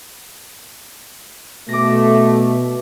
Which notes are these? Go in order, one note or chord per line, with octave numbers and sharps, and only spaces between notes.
B2 A3 D6 A#6